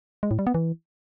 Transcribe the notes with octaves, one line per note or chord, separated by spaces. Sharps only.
G#3
A2
G3
B3
E3